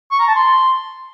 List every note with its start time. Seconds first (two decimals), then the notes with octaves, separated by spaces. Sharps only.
0.11 C#6
0.19 A#5
0.27 A5
0.35 C6